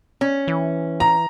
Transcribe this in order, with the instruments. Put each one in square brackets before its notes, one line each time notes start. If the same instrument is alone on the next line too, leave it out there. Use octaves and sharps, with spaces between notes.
[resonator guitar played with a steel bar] C#4
[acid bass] E3
[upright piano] A#5